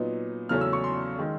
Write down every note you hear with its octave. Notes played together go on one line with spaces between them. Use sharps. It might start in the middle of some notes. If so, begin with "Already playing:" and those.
Already playing: A#2 F#3 B3 D#4
E2 C#3 F#3 A3 C#4 F6
E6
C#6
C6
D#3 G#3